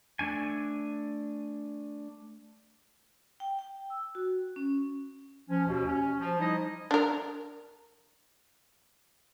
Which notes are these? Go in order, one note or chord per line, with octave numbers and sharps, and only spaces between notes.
A3 D4 G#5
G5
G5
E6
F#4
C#4
F3 C#4
D#2 B2
C#4
F3
F3 G3 D#4 E4 D#5
D4 A#4